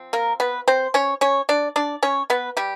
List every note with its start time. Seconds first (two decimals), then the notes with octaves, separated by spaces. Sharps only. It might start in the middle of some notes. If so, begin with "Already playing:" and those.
Already playing: F3 C4
0.13 A#3 A#4
0.40 B3 B4
0.68 C4 C5
0.94 C#4 C#5
1.21 C#4 C#5
1.49 D4 D5
1.76 D4 D5
2.03 C#4 C#5
2.30 B3 B4
2.57 G3 G4